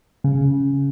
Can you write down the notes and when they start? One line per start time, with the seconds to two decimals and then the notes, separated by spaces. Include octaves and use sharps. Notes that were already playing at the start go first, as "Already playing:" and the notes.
0.24 C#3